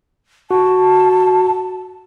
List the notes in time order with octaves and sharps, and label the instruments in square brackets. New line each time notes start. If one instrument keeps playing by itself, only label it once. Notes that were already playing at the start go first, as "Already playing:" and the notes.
[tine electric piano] F#4 [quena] A5